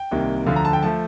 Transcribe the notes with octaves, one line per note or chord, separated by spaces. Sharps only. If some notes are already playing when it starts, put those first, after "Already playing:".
Already playing: G5
C2 C3 D#3 A#3
D2 D3 F3 F5
A#5
A5
G5
F3 A3 A5